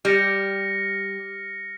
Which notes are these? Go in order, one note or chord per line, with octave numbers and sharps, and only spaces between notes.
G3 F6 A#6 C#7